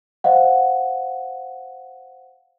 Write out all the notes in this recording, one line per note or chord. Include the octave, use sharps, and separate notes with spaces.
C5 D#5 F5 F#5